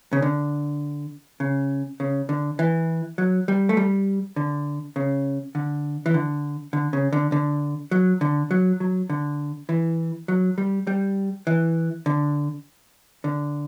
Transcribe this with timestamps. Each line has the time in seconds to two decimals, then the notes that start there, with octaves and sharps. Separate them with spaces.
0.13 C#3
0.22 D3
1.40 C#3
2.00 C#3
2.29 D3
2.59 E3
3.18 F#3
3.48 G3
3.69 A3
3.77 G3
4.36 D3
4.96 C#3
5.55 D3
6.06 E3
6.14 D3
6.73 D3
6.93 C#3
7.13 D3
7.32 D3
7.91 F#3
8.21 D3
8.51 F#3
8.80 F#3
9.10 D3
9.69 E3
10.28 F#3
10.58 G3
10.87 G3
11.47 E3
12.06 D3
13.24 D3